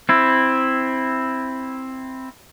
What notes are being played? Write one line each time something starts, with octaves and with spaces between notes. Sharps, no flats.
C4 E4